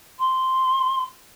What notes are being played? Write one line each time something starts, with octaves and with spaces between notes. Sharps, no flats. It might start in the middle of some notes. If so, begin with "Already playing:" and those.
C6